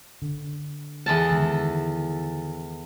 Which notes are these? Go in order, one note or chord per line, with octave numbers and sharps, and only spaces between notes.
D3
E2 A4 A5
D3 D#3 G#3